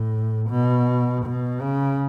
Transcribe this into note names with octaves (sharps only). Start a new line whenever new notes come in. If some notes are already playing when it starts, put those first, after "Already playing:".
Already playing: A2
B2
B2
C#3